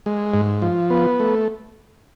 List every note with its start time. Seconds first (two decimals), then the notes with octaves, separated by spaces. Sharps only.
0.06 G#3
0.34 G#2
0.62 F3
0.90 B3
1.20 A3